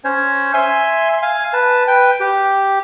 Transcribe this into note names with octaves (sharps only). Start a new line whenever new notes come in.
C#4 C5 C#5
E5 G#5 C6
F5 G#5
B4 A5
B4 G5
G4